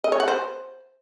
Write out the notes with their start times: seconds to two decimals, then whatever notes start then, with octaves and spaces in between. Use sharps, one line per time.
0.04 D#5
0.12 C#5
0.20 F#5
0.28 C5